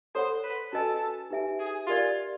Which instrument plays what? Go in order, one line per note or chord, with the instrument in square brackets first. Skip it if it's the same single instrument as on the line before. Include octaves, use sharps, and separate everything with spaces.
[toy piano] A4 C#5 F#5 B5 [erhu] C5
[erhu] B4
[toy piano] C#4 F#4 B4 D#5 G#5 [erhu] A4
[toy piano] D#4 G4 B4 E5 G#5
[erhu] G#4
[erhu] F4 [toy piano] G4 A#4 D5